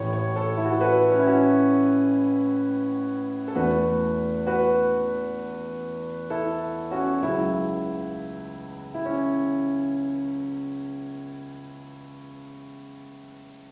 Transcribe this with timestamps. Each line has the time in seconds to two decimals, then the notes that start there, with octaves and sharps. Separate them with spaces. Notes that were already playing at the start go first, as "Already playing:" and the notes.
Already playing: A1 A2 A3 C#5
0.13 C#5
0.36 A4 C#5
0.57 E4
0.65 F#4
0.73 A4
0.80 F#4 B4
1.11 C#4
1.19 E4
1.27 C#4 F#4
3.48 A4
3.55 E2 E3 A3 F#4 B4
4.47 F#4 B4
6.30 E4 A4
6.91 C#4 F#4
7.22 C#2 C#3 F#3 E4
8.94 E4
9.05 C#4